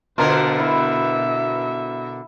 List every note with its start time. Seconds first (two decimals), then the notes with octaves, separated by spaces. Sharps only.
0.18 B2 D3 F3 F4 A#4 C5
0.58 E4 E5 B5